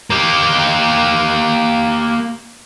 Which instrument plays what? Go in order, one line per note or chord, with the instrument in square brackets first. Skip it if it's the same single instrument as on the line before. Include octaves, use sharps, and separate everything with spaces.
[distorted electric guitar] A#3 G4